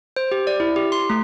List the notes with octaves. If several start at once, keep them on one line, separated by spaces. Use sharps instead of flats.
C5
G4
D5
E4
G4
C6
A3